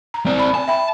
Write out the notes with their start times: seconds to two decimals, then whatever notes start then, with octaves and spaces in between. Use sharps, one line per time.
0.14 A#5
0.26 C4 D5
0.39 B5
0.54 G#5 A5
0.68 E5 G5 B5